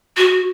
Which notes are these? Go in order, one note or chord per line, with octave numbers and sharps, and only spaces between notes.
F#4